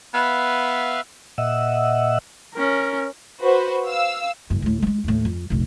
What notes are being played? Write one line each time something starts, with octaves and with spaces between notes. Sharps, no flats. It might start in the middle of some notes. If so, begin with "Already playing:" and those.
B3 B4 E5 F5
A#2 D#5 E5 F#5 E6
C#4 A#4
F#4 B4 C5
F5 E6
F#1 F#2
D2 A2
G#3 A3
D#2 A2
F2
F1 A#1